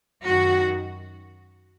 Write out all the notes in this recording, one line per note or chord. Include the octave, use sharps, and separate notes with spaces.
F#2 D#3 F#4